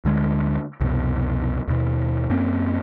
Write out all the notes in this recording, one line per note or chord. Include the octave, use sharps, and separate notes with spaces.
D2 D3 G#3
C2 F2 B2
D#2 B2
F#2 A#3 C4 C#4